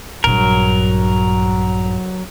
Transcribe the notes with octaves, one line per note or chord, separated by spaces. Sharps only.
A#1 G2 F#3 A#4